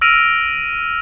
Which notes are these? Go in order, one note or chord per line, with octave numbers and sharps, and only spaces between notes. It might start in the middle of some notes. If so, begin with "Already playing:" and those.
E6 F6 A#6 D7 D#7 F7